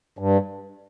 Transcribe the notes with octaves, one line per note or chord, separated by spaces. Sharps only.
G2